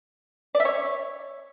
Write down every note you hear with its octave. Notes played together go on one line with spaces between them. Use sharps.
D5
E5
C#5